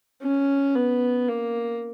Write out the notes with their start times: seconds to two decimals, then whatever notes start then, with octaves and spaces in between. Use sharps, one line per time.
0.23 C#4
0.75 B3
1.29 A#3